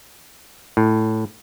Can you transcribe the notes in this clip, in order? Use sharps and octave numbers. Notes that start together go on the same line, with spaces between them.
A2